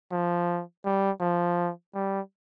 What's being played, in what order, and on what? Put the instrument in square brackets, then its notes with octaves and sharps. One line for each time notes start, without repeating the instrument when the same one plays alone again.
[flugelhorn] F3
G3
F3
G3